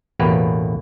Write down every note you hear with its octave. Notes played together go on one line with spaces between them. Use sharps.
A1 E2 B2 A#3 G4 B4